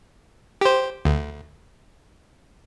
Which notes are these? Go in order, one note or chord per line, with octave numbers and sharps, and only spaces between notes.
G4 C5
D2